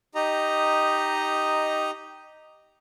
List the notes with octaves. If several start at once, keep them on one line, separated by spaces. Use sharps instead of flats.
D#4 G4 D#5 A#5